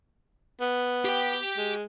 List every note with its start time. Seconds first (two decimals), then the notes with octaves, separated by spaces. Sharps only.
0.61 B3
1.05 G4 G5
1.57 G#3